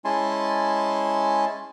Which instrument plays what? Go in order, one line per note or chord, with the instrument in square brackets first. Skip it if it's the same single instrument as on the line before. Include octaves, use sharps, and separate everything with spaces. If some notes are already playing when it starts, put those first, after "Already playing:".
[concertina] G#3 C#4 E4 G#5 A5 C6